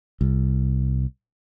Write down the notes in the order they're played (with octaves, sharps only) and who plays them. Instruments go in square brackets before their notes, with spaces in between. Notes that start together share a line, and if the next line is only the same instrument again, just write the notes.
[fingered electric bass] C2